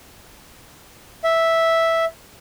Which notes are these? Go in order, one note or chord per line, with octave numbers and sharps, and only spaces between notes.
E5